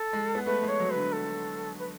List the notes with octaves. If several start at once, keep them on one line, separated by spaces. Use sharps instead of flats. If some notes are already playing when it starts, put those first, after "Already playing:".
Already playing: A4
G#3
B3
A3 B4
G#3
C#5
F#3
D3 B4
A4
B4